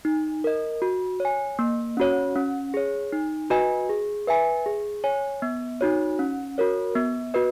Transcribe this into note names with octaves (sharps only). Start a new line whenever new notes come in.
D#4
A#4 D#5
F#4
C#5 G#5
A#3
C#4 F#4 C#5
C#4
G#4 C#5
D#4
F#4 B4 D#5 G#5
G#4
B4 E5 G#5
G#4
C#5 G#5
B3
D#4 F#4 C#5
C#4
F#4 A#4 C#5
B3
F#4 B4 D#5